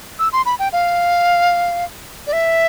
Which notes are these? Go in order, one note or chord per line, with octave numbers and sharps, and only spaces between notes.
E6
C6
B5
G5
F5
D5
E5